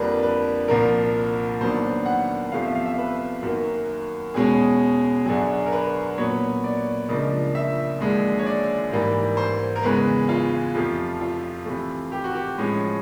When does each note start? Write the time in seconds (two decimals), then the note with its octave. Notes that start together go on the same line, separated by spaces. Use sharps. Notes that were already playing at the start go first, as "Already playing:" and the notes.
Already playing: F2 D3 G3 A#3 D4 B4
0.23 B4
0.68 C2 A#2 F3 A#3 A#4
1.60 D#2 D#3 F#3 B3 D4 C5
2.06 F#5
2.52 E2 C3 F3 A3 F5
2.63 E5
2.75 F5
2.86 E5
2.98 B4
3.42 F#2 D#3 F#3 A#3
4.34 E2 B2 G#3 C#4 G#4
5.25 F#2 D3 F#3 G#4
5.66 A#4
5.72 B4
6.18 A#2 F#3 B3 C#5
6.64 D5
7.08 C#2 C#3 F3 A#3 D4 D#5
7.55 E5
8.00 D#2 D3 F3 G#3
8.39 C#5
8.46 D5
8.92 G#2 E3 G3 A#3
9.37 C5
9.76 A#4
9.83 E2 C#3 E3 G#3 B4
10.29 F4
10.74 F2 C3 F3 A3
11.21 F4
11.66 C3 E3 A3
12.12 G4
12.24 F#4
12.35 G4
12.58 A2 F3 G#3 C#4